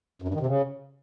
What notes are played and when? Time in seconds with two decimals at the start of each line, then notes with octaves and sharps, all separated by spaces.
0.22 F#2
0.28 G2
0.34 D#3
0.40 C3
0.46 C#3